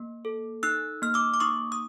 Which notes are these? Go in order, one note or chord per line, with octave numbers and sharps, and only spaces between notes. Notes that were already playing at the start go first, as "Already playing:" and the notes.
Already playing: A#3
A4
D#4 E6 F#6
A#3 F6
D6 E6
D6
D#4 C#6 D#6
D#6